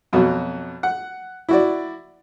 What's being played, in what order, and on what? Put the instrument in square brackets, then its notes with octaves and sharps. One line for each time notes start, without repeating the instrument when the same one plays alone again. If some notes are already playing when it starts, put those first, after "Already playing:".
[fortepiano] F2 B2 F#3
F#5
E4 F#4 D5